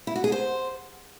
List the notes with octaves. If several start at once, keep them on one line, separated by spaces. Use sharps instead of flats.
E4
F#4
G#4
C5